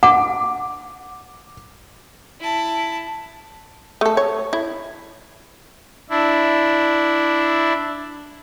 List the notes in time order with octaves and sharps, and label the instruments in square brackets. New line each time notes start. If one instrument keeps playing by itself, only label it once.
[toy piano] F#5 [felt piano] D6
[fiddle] E4 A5
[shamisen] A3 A4
C#5
E4
[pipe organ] D4 E4